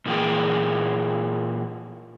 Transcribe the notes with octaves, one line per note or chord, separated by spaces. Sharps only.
A#2 E3 A#3 G#4 G5